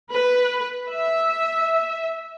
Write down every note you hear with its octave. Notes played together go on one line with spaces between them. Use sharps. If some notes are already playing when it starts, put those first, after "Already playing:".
B4
E5